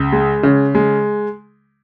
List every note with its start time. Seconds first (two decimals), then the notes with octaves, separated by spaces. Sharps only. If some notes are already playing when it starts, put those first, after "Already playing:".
Already playing: C#2
0.12 G#3
0.43 C#3
0.75 G#3